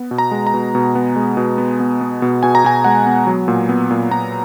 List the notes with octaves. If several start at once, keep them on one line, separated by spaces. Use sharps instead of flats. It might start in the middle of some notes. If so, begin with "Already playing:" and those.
Already playing: B3
B2
A#5
G#3
A#5
B2
B2
B3
G#3
B2
B3
B3
B3
B2
B2 G#5
A#5
B2 G#5
G#3 F#5
B3
F#3
A#2
B3
A#2
A#2 A#5